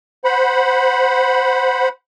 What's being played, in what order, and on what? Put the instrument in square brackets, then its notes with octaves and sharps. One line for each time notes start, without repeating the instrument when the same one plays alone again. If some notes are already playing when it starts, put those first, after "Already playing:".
[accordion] C5 F#5 B5